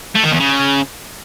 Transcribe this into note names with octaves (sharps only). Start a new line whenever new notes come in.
A3
D#3
E2
C#3